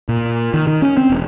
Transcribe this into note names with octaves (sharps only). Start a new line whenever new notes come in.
A#2
D#3
D#3
C#4
C4
E1